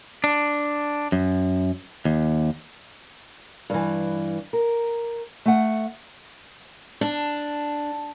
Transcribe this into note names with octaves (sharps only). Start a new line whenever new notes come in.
D4
F#2
D#2
G2 E3
A#4
A3 F#5
D4